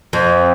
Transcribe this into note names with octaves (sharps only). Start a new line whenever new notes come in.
F2